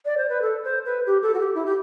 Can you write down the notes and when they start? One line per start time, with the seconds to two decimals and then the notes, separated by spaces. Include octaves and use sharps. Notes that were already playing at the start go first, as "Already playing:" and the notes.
0.05 D5
0.17 C5
0.29 B4
0.41 A4
0.64 C5
0.85 B4
1.06 G4
1.22 A4
1.34 F#4
1.39 G4
1.54 E4
1.65 G4